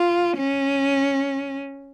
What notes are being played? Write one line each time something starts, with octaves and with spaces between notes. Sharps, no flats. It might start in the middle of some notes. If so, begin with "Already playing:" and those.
Already playing: F4
C#4